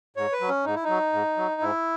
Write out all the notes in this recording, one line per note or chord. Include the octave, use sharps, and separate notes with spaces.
G#2 C#5
B4
F#3
C#4
G#2 D#4
E4
F#3 D#4
G#2
F#3
G#2 E4